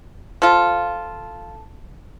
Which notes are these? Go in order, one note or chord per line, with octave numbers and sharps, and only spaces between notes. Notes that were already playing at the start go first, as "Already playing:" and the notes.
F3 F4 A4